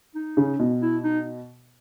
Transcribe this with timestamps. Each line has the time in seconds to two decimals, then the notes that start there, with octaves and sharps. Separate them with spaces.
0.15 D#4
0.37 C#3
0.59 B2
0.82 E4
1.04 D#4